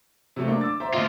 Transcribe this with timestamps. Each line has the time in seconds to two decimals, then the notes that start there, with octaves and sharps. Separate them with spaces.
0.36 C3 F#3 A3
0.48 A#3 D4
0.61 D6 E6 A6
0.80 C5 E5 A#5
0.93 D2 F4 D#5 E5